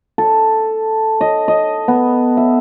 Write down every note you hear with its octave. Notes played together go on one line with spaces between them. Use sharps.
A4
D#5
D#5
B3
E5